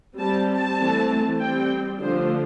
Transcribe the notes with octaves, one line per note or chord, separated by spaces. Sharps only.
G3 C4 A5
A5
E3 A3 C4
G3 C4 G5
D3 F3 A3 D4 C5